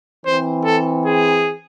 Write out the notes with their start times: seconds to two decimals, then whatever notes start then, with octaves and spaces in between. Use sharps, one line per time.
0.24 E3 C4 C5
0.65 A4
1.05 G#4